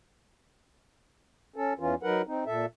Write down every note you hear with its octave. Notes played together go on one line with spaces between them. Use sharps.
C#4 A4
E2 E3 C#4 F4
F#3 D#4 A#4 B4 F#5
C4 D#4
A#2 A4 E5